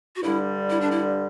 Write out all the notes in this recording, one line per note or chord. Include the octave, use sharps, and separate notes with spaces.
F#4
G2 D3 G3 E4
E4
D4
E4